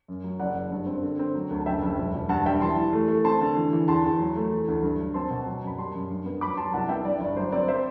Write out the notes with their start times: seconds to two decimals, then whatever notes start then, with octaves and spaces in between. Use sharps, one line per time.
0.08 F#2
0.24 F#3
0.40 F#1 D5 F#5
0.55 F#1
0.71 G2
0.87 C4
1.02 D3
1.19 C4
1.35 F#3
1.51 D2
1.60 A5
1.66 F#1 E5 G5
1.82 F#1
1.98 E1
2.15 E1
2.29 G2 F#5 A5
2.46 G3 E5 G5
2.61 E3 A5 C6
2.77 E3
2.93 A3
3.08 A3
3.24 C4 A5 C6
3.41 D3
3.57 E3
3.73 E3
3.88 E2 A5 C6
4.05 E2
4.19 F#3
4.36 A3
4.51 E3
4.68 D2
4.83 G2
4.98 F#3
5.14 C4 A5 C6
5.30 B2
5.46 F#3
5.63 F#2 B5
5.78 G3 A5 C6
5.95 F#2
6.11 G2
6.26 B3
6.41 F#3 B5 D6
6.57 F#3 A5 C6
6.73 C2 F#5 A5
6.89 B3 E5 G5
7.05 G2 D5
7.21 G1 D5
7.37 F#3 C5
7.52 C4 D5
7.68 C5 E5